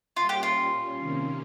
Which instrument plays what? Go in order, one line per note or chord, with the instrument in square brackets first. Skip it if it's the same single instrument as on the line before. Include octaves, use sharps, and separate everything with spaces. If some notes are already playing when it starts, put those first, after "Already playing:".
[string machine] A#2 G3 C#4 [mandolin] F4
[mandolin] G4
F4
[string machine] C3 D#3 A#3 C#4